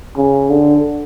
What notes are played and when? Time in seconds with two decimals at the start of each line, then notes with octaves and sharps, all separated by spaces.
0.17 C#3
0.50 D3